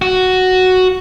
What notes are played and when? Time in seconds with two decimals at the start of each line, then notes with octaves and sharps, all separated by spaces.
0.02 F#4